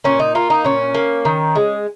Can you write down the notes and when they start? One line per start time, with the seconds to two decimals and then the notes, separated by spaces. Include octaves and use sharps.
0.04 A#2 C#4
0.20 D#4
0.35 A#3 F4
0.50 D#4
0.64 A#2 C#4
0.95 A#3
1.25 D#3
1.55 G#3